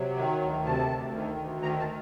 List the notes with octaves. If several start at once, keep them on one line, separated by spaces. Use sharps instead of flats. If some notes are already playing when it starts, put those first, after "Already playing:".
Already playing: C3 F#3
D#3
D2
C3 A5
D2
D#3
D2
D#3 A#5
A5